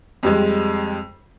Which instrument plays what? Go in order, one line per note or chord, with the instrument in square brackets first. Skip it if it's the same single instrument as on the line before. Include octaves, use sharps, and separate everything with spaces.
[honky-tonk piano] F2 G3 G#3